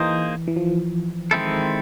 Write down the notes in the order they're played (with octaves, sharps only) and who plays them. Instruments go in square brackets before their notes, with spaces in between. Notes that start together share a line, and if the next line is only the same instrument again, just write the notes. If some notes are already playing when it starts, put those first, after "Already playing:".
Already playing: [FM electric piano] E3 [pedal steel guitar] A#3 D#4 G#4 C5 D#5
[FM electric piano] E3
F3
[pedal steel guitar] D#3 G#3 C4 E4 A4